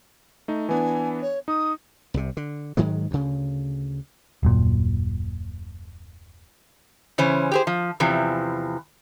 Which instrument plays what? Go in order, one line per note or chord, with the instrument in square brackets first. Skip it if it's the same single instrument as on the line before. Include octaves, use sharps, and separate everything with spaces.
[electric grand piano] A3 D#4
[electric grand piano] E3 B3 D4 [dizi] G#5
[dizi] C#5
[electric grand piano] D#4 [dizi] D#6
[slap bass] C2 C3
D3
G#2 D#3 F#3 G#3
D2 C#3
[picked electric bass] D#1 F#2 A#2
[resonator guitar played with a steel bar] C#3 E3 C#4 C5
G4 G#4 C5
F3
E2 C3 E3 F3